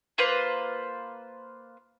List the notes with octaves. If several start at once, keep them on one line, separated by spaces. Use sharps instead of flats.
A#3 F4 B4 C5